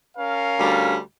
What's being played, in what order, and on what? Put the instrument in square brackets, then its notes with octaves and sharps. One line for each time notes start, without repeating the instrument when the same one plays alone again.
[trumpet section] C#4 A#4 F5
[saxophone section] D2 G3